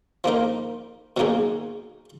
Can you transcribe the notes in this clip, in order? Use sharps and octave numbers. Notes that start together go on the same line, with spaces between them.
F3 A#3 D#4 A#4
B2 F#3 A#3 D#4 G#4